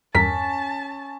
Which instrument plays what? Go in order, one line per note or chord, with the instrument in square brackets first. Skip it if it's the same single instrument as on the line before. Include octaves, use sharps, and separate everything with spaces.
[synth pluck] E2 G2 A#4 [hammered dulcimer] C#4 [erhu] A5 [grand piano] B6